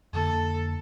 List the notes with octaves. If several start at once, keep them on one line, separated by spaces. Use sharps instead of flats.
F2 D3 A#3 A4